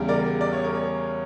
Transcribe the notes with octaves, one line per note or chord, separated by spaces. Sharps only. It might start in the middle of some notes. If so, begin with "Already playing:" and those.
Already playing: E2 C#3 G3
A#4 D5
D5
C#5
A#4
C#5